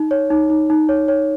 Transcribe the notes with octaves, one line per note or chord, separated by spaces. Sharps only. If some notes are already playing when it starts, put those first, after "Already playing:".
Already playing: D#4
C#5
D#4
D#4
D#4
C#5
C#5